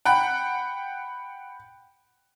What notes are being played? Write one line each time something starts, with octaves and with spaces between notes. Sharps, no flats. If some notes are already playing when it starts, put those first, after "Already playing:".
F#5 G5 B5 F#6